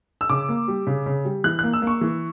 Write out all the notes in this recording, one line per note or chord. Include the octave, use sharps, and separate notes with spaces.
E6
C#3 D6
A#3
G3
C#3
C#3
G3
E3 F#6
A#3 F#6
E6
A#3 C#6
E3